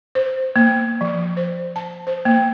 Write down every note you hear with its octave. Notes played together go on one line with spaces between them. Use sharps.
C5
A#3
F3
C5
A5
C5
A#3